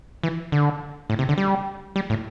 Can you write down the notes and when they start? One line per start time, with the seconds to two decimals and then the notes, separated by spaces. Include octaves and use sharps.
0.23 E3
0.52 D3
1.10 A2
1.19 C3
1.29 D3
1.38 G3
1.96 G3
2.10 A2